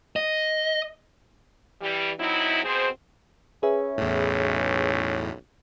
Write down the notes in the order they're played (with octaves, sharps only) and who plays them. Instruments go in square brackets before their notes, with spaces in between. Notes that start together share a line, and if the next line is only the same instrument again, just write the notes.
[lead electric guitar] D#5
[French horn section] E3 G3
F#3 C4 D#4 E4
B2 C4 G#4 C5
[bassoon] C#4 [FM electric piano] G#4 B4 E5
[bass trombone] B1 [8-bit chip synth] E2 A2